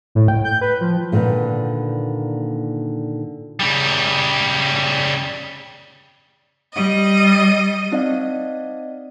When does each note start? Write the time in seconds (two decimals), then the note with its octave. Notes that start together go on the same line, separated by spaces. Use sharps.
0.15 A2
0.28 G5
0.44 G6
0.61 B4
0.81 F3
1.12 A#2 D3 D#3 A#3 B3
3.60 C#3 G3
6.74 G3 D#5
7.92 C4 D#4 D5 D#5 F5